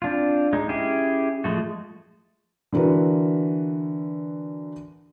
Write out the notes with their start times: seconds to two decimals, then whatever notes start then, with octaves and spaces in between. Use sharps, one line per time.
0.02 C4 D4 F4
0.53 G#3 D#4
0.69 C#4 E4 G4 G#4
1.44 F3 G#3 A3 F#4
2.73 D3 E3 F#4 A#4 B4